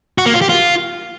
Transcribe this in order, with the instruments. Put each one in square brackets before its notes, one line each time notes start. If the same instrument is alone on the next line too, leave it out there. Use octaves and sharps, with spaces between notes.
[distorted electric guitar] F#4
A#3
F4
G4
F4